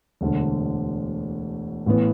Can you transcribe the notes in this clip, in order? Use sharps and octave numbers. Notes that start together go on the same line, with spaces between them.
E1 D2 D3
A1 A2 E3 B3